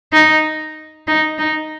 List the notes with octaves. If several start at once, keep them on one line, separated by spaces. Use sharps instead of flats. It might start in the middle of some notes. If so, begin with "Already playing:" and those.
D#4
D#4
D#4